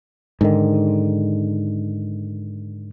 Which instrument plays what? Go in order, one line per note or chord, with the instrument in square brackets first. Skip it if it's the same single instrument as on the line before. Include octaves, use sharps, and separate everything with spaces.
[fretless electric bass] G#2 D3 D#3